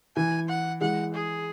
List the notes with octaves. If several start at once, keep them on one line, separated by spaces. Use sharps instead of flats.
E3 G#5
F#5
E3 G#3 F#5
G#4